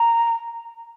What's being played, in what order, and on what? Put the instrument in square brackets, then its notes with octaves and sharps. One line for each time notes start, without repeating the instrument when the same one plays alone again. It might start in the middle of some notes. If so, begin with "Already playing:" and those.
Already playing: [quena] A#5